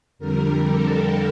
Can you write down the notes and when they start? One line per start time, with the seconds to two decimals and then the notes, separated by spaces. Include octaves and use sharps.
0.19 F2 D3 G3 A#4
0.66 A4